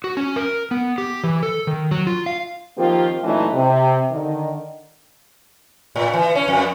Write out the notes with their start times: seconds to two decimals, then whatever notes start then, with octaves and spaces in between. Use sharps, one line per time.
0.04 F#4
0.17 C#4
0.36 A#4
0.71 B3
0.98 G4
1.24 E3
1.43 A4
1.67 D#3
1.91 F#3
2.07 F4
2.26 F5
2.77 D#3 F3 A#3 C4 F4 G4
3.24 A#2 E3 F#3 A3 C#4 D#4
3.54 C3
4.11 D3 D#3
5.96 A2
6.13 E3
6.35 C#4
6.48 F2